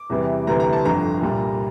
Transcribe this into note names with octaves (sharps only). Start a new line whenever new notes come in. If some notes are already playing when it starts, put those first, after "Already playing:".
Already playing: D6
E2 C3 E3 G3
D2 C3 E3 G3 A#5
A#5
A5
G1 F2 D3 A#5
C2 A#2 G3